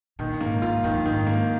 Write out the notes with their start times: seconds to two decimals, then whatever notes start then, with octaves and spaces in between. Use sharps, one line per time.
0.19 A#2 D#3
0.40 G#2 A#3
0.62 G#2 F4
0.84 F2 D#3
1.06 G#2 D#3
1.27 A#3